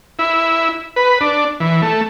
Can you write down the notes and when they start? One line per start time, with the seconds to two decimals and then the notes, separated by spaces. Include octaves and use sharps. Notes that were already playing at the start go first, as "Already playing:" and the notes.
0.19 E4
0.96 B4
1.21 D4
1.60 E3
1.82 A3